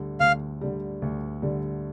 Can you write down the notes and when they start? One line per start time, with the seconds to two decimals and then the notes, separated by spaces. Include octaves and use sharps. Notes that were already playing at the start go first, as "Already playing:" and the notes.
Already playing: D2 D3 G3
0.20 D2 F5
0.61 D3 G3
1.02 D2
1.42 D3 G3